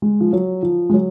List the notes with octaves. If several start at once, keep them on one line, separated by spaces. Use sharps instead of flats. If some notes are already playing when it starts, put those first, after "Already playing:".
G#3
F3
F#3
F3
G#3
F#3